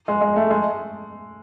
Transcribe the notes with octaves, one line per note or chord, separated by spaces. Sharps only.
G#3
G#3
A3
G#3